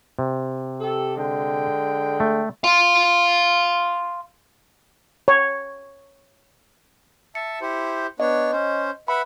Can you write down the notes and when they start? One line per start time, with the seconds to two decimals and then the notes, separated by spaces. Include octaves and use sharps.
0.19 C3
0.80 G4 A4
1.17 D3 G#3 G5
2.20 A3
2.64 F5 C6
5.28 C#5
7.35 E5 A5 C#7
7.61 E4 G4 C5
8.20 B3 D4 C#5 D#5
8.52 C#4 C5
9.08 B4 E5 F#5 B5